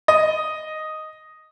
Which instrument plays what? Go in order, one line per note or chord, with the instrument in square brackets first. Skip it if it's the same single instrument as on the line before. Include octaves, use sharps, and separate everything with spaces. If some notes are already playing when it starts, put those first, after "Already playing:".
[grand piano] D#5